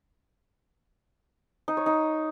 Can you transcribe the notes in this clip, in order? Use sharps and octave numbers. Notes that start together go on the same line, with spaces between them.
D#4
C#5
D#4